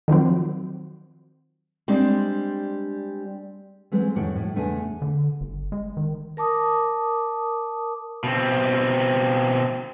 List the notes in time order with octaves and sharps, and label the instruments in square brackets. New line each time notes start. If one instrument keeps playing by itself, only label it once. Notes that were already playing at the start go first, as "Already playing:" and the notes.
[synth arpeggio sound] D#3 F3 F#3 C4
[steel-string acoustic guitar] G3 G#3 C4 D4
[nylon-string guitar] E3 F#3 G#3 A3 C4
F2 A2 D#3 F#4 C#5 G5
A2
E2 C#3 A3 D4 G#4 G#5
[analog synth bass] D3
G1
G#3
D#3
[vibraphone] A#4 A5 D6 D#6
[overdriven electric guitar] B2 C4